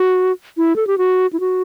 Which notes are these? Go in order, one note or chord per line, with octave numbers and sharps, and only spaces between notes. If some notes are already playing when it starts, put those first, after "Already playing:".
Already playing: F#4
E4
A4
G4
F#4
E4
F#4